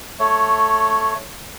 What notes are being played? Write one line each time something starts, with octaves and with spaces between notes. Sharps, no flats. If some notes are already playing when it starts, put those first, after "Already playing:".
A3 C#5